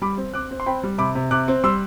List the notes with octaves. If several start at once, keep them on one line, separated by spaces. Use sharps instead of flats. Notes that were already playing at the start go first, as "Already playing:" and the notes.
G3 B5 D6
C4
C4 D6 F#6
C4
C6
C4 G5 B5
G3
C3 B5 D6
C3
C3 D6 F#6
C4
G3 C6 E6